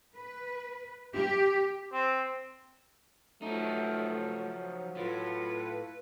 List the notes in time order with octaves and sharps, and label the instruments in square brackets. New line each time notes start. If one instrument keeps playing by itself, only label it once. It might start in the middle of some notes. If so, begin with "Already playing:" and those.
[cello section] B4
G4
[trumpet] C4
[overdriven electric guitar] F3 D#4 [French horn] F#3 [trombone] A3
[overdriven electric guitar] A2 [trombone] F4 [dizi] B4